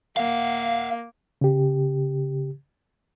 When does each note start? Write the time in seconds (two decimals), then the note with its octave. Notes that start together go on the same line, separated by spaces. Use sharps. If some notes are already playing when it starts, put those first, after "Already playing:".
0.17 A#3 E5 F5
1.41 C#3 G4